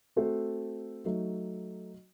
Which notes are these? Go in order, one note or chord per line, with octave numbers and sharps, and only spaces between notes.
A3 C4 F#4 A4 C5
F#3 A3 D#4 F#4